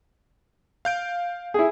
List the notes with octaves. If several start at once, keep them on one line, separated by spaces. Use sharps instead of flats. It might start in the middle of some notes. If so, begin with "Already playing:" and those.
F5 G6 D7
E4 G#4